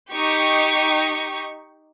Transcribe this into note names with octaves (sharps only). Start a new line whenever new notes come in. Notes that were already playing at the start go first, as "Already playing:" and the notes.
D#4 G4 C#6